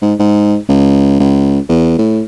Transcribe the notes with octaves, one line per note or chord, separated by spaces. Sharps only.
G#2
G#2
C#2
C#2
E2
A2